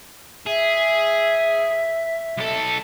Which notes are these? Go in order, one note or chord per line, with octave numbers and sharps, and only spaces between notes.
G#4 E5
B1 A4